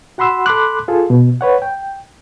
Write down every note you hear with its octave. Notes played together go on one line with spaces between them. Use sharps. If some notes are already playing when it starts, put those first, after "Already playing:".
F#4 F#5 B5 C6 E6
A4 B5 C6 D6 F#6
F4 G#4 A4
B2
B4 C#5 F#5
G5